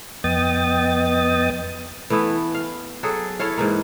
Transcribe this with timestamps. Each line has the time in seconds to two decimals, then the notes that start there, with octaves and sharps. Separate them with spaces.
0.24 F2 B3 D#5 G5 D#6 A6
2.10 E3 A3 B3 E4
2.55 F5
3.03 F#3 F#4 G#4 A4
3.39 E4 A4 C#5 F5
3.57 G#2 E3 A#3